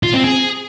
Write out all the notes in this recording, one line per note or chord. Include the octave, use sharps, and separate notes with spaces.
F4
C4
G#4